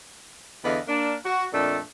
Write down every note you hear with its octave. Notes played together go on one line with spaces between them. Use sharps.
E2 D3 B4 D#5 F5
A#3 D4
F#4
F2 A#2 A3 D4 A4